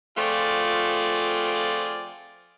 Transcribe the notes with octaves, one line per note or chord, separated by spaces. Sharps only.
F3 A3 C4 F4 G#4 D5